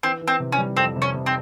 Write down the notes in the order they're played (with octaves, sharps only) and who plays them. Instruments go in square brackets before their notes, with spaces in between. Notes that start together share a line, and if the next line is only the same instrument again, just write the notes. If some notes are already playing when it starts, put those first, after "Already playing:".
[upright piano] E3 [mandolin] C4
[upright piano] E3
[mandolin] C4
[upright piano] C3
[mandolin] C#4
[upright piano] G3
[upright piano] F2 [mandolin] C4
[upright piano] C3
[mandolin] C#4
[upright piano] C3
[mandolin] C4